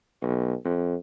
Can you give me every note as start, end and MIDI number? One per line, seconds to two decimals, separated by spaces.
0.22 0.54 35
0.65 0.95 41